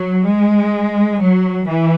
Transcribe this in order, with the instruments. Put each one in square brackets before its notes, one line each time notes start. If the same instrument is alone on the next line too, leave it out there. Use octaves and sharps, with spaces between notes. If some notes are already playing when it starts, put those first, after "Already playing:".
Already playing: [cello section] F#3
G#3
F#3
E3